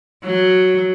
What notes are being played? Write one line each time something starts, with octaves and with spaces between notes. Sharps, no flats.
F#3